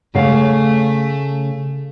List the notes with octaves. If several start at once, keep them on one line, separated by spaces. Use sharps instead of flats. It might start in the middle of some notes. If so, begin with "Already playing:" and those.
C#3 A3 F5